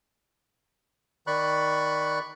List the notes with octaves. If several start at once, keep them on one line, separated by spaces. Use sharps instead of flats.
D#3 D5 B5 C#6 F#6